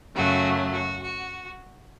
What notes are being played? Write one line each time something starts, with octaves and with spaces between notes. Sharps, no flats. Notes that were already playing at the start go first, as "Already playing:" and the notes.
F#2 C#3 F#3 A3 F#4
F#4
F#4